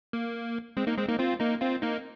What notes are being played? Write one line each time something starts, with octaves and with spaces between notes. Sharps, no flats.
A#3
G#3 C4
A#3 D#4
G#3 C4
A#3 D#4
C4 F4
A#3 D#4
C4 F4
A#3 D#4